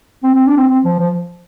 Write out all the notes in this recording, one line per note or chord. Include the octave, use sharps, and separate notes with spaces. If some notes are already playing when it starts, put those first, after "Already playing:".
C4
C4
D4
C4
C4
F3
F3